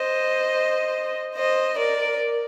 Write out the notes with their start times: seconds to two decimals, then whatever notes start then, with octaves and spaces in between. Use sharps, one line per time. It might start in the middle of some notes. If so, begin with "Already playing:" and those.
Already playing: C5 D#5
1.36 C5 D#5
1.78 A#4 D5